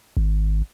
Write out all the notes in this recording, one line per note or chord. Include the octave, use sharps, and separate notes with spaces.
G#1